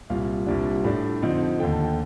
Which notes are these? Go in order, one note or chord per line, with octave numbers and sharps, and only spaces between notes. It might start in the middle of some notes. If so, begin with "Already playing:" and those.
C2 A#2 G3 F5
C2 A#2 G3 D4
A2 A3 D4
F2 D3 F3 C4 D#4
D#2 D3 A3 G5
A5
G5